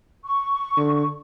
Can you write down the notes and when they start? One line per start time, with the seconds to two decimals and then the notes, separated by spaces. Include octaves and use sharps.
0.24 C#6
0.77 D3